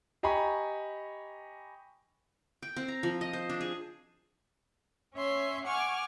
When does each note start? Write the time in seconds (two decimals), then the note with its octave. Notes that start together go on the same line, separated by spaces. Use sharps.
0.23 G4 D#5 G#5 A#5 B5 C#6
2.62 G5
2.76 C4
2.88 A#5
3.03 F3
3.21 D#5
3.33 C5
3.49 D4
3.61 G#4
5.14 C#4 C#5 E5 C6
5.65 F#5 G#5 C#6 D6 F6